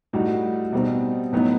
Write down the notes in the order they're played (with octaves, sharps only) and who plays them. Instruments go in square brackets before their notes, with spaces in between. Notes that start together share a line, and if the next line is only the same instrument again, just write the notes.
[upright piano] A2 G3 D#4 F#4
B2 G3 C4 D#4
A2 F#3 B3 D#4